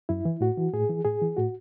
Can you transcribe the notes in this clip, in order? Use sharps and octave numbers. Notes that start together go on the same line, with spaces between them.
F#2 E4
E3
A2 F#4
E3
A2 G#4
E3
A2 G#4
E3
A2 F#4